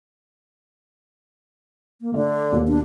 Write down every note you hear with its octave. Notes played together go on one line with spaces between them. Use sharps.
A#3
D3 A3
D#2 B2
D4